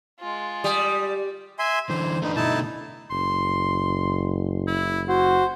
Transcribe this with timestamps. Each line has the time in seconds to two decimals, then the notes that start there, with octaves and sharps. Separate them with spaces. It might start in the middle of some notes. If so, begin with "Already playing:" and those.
0.19 G#3 F4
0.64 G3 D#6
1.59 E5 G#5 C6
1.90 D3 E3 C5
2.22 A3 D4 D#4 B4
2.36 B2 D3 A3 D#4 E4 A5
3.11 F#1 C6
4.67 E4
5.09 F#4 C5